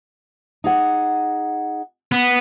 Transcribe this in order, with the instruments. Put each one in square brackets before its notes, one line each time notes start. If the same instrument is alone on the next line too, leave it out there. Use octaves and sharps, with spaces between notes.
[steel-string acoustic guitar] D#4 G#4 F#5
[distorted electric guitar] B3